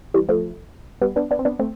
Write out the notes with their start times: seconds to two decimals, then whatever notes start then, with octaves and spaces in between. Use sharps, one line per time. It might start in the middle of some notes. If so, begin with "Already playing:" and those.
0.14 E3 G3
0.29 F3 A3
1.02 G3 B3
1.16 B3 D4
1.31 B3 D4
1.39 C4
1.45 B3 D4
1.59 A3 C4